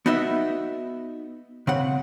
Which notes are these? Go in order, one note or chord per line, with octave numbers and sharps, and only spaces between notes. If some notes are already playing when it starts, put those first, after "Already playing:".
B3 D#4 F#4 D#5 E5
C#3 C4 F#5